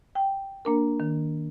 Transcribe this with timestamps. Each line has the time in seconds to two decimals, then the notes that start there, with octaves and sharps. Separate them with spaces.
0.15 G5
0.65 A#3 D4 A#4
1.00 D#3